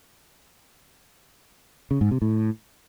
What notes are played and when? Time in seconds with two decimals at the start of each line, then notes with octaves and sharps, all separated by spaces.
1.91 C#3
2.01 G#2
2.11 C3
2.22 A2